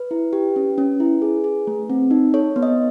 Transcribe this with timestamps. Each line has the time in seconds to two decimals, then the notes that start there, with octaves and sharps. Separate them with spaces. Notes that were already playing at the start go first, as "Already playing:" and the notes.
Already playing: B4
0.11 E4
0.33 G4
0.56 C#4
0.78 C#4
1.00 E4
1.22 G#4
1.44 G#4
1.67 A3
1.90 C4
2.11 D#4
2.34 A4 C#5
2.56 B3
2.63 D#5